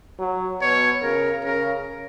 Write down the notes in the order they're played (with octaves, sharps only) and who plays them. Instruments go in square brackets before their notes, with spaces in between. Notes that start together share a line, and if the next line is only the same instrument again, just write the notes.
[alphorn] F#3
[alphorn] B2 [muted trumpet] C#5
[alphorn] C#3 [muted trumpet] A#4
[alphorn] C#3 [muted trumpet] A#4